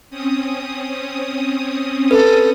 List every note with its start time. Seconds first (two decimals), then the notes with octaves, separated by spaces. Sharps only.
0.10 C4 C#4 D#6
2.11 A4 B4